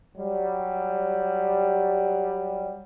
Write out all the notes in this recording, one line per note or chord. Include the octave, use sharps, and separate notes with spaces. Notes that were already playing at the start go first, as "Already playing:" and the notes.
F#3 G3